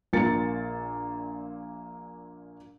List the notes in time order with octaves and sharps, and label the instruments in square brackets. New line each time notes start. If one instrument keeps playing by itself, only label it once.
[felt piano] A#1 A#2 A#3 F4 A6 C#7